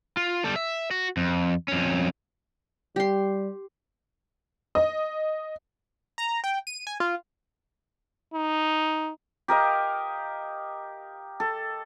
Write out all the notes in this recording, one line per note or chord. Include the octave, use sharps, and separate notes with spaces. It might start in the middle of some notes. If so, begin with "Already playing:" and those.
F4
G3 A4
E5
F#4
F2
F2 C#4
G3 G4 C6
D#5
A#5
G5
D#7
G#5
F4
D#4
G4 A#4 D#5 F5
A4